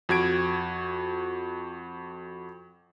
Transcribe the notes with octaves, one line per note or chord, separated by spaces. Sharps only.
F2 F#4 G#6 D7